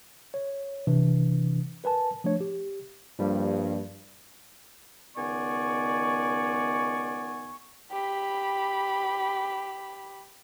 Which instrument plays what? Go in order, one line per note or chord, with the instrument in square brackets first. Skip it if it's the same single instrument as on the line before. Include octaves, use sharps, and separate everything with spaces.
[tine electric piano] C#5
C3 E3 D4
A#4 B4 G#5 A5
F3 A3 D4 C#5
G4
[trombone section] G2 [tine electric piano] F3 G3 A#3
[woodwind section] C#2 D#3 B3 D5 G#5 C#6
[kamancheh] G4 B5